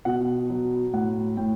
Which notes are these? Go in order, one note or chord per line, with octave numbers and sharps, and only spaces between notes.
B2 F#5
F#3
A2 F#5
A2 G5